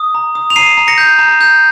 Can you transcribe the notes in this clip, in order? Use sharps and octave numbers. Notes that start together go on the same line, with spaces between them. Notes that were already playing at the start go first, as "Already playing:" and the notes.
Already playing: D#6
A#5
D#6
F7
A#5 C7 D#7
A#5
A#6 C#7
G6
A#5
G6